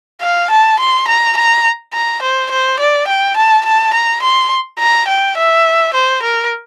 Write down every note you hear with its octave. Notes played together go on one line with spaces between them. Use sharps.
F5
A5
C6
A#5
A#5
A#5
C5
C5
D5
G5
A5
A5
A#5
C6
A#5
G5
E5
C5
A#4